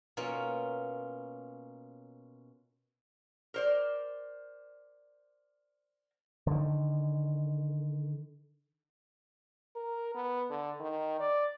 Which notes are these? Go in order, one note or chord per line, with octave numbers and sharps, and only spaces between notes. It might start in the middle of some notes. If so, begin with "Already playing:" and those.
B2 A#3 C#4 F4
A#4 C5 D5
D3 D#3
A#4
B3
D3
D#3
D5